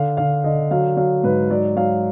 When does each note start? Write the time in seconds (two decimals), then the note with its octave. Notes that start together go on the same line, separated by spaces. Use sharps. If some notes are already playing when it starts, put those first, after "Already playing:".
Already playing: D3 F5
0.17 D3 F5
0.44 D3 D#5
0.71 F#3 F5
0.97 F#3 F5
1.23 G#2 B4
1.50 F#3 D5
1.76 F#3 F5